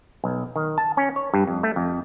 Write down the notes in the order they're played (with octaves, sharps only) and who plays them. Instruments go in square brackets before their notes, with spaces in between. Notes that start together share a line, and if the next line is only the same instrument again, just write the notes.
[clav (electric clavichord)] B1
D#3
A5
C#4
C#5
G2
F2
A3
F2